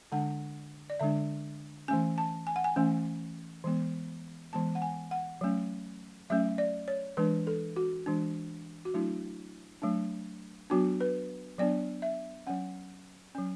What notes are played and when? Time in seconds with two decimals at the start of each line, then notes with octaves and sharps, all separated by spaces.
0.12 D3 G#3 D4 F#5
0.90 D5
1.00 D3 G#3 D4 E5
1.88 E3 A3 C#4 G#5
2.18 A5
2.47 G#5
2.56 F#5
2.64 G#5
2.76 E3 A3 C#4
3.64 E3 G#3 B3
4.53 E3 G#3 B3 A5
4.75 F#5
4.82 G#5
5.11 F#5
5.41 F#3 A3 C#4
6.30 F#3 A3 C#4 E5
6.58 D5
6.88 C#5
7.17 E3 G#3 D4 B4
7.47 A4
7.76 F#4
8.06 E3 G#3 D4
8.85 F#4
8.94 F#3 A3 D4 E4
9.82 F#3 A3 D4
10.70 F#3 B3 D4 F#4
11.01 B4
11.58 F#3 B3 D4 D5
12.02 E5
12.47 F#3 C#4 F#5
13.35 F#3 C#4